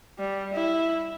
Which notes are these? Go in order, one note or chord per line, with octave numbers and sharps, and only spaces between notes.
G3
E4